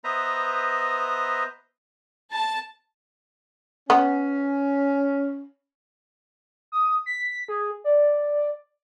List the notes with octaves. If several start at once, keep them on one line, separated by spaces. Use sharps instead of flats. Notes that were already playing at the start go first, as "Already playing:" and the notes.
B3 B4 C5 D#5 E5 A#5
A5
B3 C#4
D#6
B6
G#4
D5